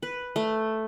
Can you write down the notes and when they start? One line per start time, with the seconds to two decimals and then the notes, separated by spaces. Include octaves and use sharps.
0.03 B4
0.36 A3